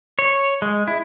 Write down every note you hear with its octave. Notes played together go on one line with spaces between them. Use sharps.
C#5
G#3
E4